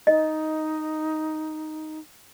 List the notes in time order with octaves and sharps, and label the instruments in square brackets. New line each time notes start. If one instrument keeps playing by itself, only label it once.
[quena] D#4 [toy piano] D#5